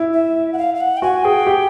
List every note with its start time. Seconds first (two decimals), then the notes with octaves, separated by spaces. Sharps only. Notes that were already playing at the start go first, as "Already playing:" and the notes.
Already playing: E4
0.13 E5
0.53 F#5
0.58 F5
0.75 F5
0.81 F#5
0.97 G5
1.02 F#4 G#5
1.24 G#4 G5
1.47 G4